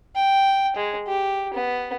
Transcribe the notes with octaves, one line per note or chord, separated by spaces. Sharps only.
G5
G#3
G4
B3